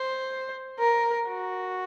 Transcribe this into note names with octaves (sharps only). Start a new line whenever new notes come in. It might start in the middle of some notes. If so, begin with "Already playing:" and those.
Already playing: C5
A#4
F#4